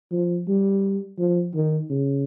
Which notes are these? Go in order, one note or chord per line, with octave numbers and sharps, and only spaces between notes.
F3
G3
F3
D#3
C#3